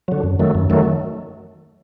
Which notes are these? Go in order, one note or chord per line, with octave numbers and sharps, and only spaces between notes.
D3 F#3
F#2
D#3 F#3 A3
F#2
D#3 F#3 A3